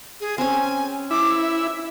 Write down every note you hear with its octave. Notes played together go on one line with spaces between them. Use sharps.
G#4
C4 C#4 G#5
E4 D6
E5